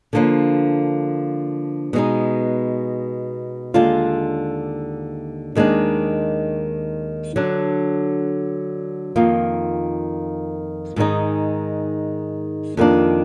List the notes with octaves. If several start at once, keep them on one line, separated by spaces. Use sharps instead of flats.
D3 F3 A#3 D4
B2 G#3 B3 D#4
D#2 D3 G#3 D4 F4
D#2 D#3 G#3 D4
D3 F#3 D4
F2 D#3 A#3 F4
G#2 D#3 G#3 D#4
F2 D#3 A#3 D4